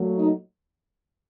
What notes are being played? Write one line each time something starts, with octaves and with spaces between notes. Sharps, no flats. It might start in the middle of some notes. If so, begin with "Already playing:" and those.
Already playing: A#2 F#3 A3
D#4